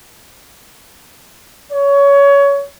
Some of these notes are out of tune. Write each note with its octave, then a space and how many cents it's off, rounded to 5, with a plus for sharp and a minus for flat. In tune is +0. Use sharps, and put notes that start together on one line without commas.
C#5 +20